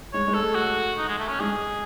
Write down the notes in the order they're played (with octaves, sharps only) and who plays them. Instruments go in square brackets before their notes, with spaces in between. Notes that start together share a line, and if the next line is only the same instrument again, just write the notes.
[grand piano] G#3 [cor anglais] C#5
[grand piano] G#3
[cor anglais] A4
[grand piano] A3
[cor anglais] F#4
D#4
G#3
A3
C#4
[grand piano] G#3 [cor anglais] G#4